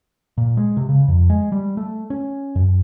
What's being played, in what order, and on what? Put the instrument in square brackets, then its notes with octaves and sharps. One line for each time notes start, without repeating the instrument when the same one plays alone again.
[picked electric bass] A#2
G#3
C3
C#3
F2
G#3
G3
A3
C#4
F#2